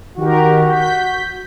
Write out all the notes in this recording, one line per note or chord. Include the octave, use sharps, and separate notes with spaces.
D#3 F#4 G4 A#4
G6 B6